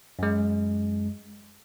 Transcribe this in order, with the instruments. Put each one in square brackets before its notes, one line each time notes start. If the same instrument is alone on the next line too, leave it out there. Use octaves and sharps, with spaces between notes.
[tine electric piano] F#2 G#3